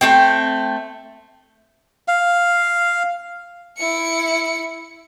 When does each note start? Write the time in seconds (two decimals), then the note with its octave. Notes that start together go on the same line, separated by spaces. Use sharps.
0.01 A3 C4 G5
2.08 F5
3.77 E4 C#7